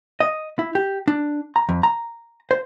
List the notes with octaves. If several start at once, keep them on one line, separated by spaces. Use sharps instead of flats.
D#5
E4
G4
D4
A#5
F2
A#5
C5